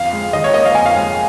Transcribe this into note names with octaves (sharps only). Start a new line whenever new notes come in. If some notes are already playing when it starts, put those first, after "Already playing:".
Already playing: F2 F5
G#3
D#2 D#5
C#5
A#3 D#5
F5
F2 G#5
F5
G#3